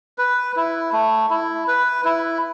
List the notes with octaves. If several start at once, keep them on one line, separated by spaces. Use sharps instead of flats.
B4
E4
A3
E4
B4
E4